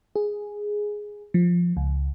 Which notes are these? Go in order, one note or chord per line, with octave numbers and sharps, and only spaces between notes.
G#4
F3
C#2